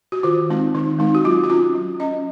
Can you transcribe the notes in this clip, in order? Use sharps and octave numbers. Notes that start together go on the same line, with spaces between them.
F#4
D#3 F4
G#3 C4 D#4
D#3 D#4
G#3 C4 D#4
F#4
F#3 F4
F#4
C#4 F4
F#3
C#4 D#5